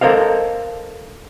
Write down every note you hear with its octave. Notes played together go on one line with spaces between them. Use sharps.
A4 A#4 C5 D#5 F5